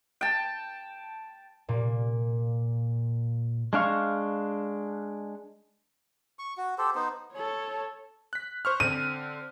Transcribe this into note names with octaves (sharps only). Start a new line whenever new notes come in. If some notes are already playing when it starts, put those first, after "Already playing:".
G5 A5
A#2 A#3
G#3 D4 F5 C#6
C#6
F#4
G4 A4 C5
B3 D#4 C5
A4 C#5
F#6 B6
C5 C#6 F6
D3 C4 D#7